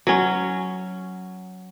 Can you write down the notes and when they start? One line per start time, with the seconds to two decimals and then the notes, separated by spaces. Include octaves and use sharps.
0.07 F#3 C#4